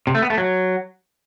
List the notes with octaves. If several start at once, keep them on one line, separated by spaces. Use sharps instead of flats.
C3
A3
B3
A3
F#3